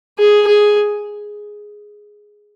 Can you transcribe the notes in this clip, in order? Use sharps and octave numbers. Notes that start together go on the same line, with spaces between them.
G#4
G#4